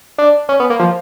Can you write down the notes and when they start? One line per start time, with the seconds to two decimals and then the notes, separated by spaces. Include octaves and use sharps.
0.18 D4
0.49 C#4
0.60 B3
0.70 A#3
0.80 F3